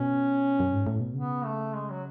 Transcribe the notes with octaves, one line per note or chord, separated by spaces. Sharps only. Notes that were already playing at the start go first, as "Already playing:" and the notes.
Already playing: B2 C#4
F#2
G#2
A2
B2
C#3 B3
A3
G#3
F#3